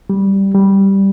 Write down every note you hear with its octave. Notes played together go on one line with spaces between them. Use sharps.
G3
G3